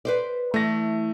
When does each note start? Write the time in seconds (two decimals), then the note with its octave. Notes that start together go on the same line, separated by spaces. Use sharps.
0.05 B4 C5 D5
0.54 E3 A3 A#6